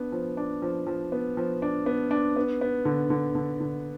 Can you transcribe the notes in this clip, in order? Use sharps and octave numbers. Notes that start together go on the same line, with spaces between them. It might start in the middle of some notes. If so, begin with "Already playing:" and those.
Already playing: B3 D4
F3
D4
F3
F3
B3
F3
D4
B3
D4
B3
B3
D3
D3
D3
D3